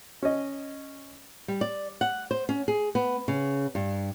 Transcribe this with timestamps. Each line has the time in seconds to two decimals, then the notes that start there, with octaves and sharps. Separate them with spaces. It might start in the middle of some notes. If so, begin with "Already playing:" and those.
0.23 C#4 D#5
1.48 G3
1.61 D5
2.01 F#5
2.31 C5
2.49 C#4
2.68 G#4
2.95 B3
3.28 C#3
3.75 G2